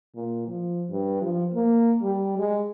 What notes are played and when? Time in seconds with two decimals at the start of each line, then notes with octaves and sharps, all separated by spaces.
0.16 A#2
0.48 F3
0.90 G2
1.22 F3
1.54 A#3
2.02 G3
2.38 G#3